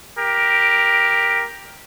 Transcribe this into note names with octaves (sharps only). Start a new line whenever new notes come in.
G4 A#4